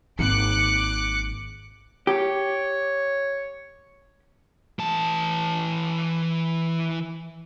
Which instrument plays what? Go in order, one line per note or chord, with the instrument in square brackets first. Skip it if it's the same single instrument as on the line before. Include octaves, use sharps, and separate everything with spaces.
[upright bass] G#1 A#3 [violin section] D6 F#6 C#7
[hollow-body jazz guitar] G4 [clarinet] C#5
[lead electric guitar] E3 A5